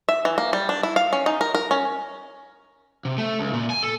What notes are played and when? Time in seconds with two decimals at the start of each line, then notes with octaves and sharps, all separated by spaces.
0.09 E5
0.25 E3
0.38 A#3
0.53 G3
0.69 D4
0.83 E4
0.96 F5
1.13 C#4
1.26 D#4
1.41 A#4
1.55 A#4
1.71 C#4
3.05 C3
3.18 A3
3.39 C#2
3.53 A#2
3.70 G#5
3.83 A4